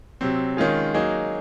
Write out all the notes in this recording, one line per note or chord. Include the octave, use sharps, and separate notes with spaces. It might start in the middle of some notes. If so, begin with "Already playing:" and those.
C3 F#3 C4
D#3 G#3 C#4 F4 G#4
F#3 A#3 D#4 G#4